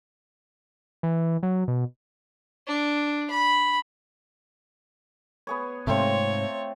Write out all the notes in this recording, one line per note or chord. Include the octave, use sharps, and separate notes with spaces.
E3
F#3
B2
D4
B5
B3 G#4 C#5
G#2 C3 A3 C4 F4 C#5